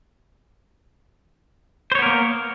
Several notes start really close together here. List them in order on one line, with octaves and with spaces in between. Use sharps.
C5 C#5 B3 A#4 A#3